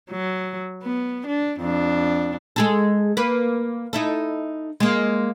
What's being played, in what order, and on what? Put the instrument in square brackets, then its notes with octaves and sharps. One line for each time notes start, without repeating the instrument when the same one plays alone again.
[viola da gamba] F#3
B3
D4
F2 D4
[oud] G#3 G#4 A4
A#3 B4
D#4 E4 A4
G#3 A#3